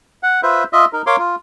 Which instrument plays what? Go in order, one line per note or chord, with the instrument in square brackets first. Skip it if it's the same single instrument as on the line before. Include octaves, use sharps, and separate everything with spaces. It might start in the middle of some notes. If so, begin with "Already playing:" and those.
[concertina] F#5
F4 B4 C5 E5
F4 D#5 E5
D#4 A#4
A#4 C#5 F5 C6 D6
F4